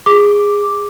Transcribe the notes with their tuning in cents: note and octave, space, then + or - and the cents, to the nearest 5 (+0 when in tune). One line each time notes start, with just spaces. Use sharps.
G#4 -15 D6 +0